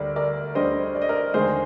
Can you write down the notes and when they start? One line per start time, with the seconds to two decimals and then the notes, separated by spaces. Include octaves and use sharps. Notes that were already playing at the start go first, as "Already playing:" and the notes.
Already playing: D2 D3 G3 A#4 D5
0.16 A#4 D5
0.55 D2 D3 G3 C5 D#5
0.95 D5
1.02 D#5
1.09 A#4 D5
1.34 D#2 D3 G#3 G#4 C5